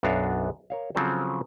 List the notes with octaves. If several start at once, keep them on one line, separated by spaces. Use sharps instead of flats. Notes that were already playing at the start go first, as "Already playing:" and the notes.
B1 F#2 B3 D4 F#4 F5
A#4 C#5 F5
C#3 F3 F#3 C4 A4 C5